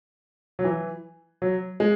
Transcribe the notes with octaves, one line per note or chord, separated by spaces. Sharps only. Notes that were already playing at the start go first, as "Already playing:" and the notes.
F#3
E3
F#3
G#3